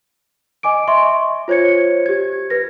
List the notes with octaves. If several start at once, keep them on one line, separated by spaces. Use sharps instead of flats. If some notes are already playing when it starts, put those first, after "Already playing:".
D#5 G#5 D6 D7
D#5 E5 C6 C#6
F4 C5 C#5 G#6 C#7
G4 G#6
B4 A#6